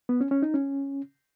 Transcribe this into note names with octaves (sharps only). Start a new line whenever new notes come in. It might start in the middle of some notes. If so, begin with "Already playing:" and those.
B3
C#4
C#4
D#4
C#4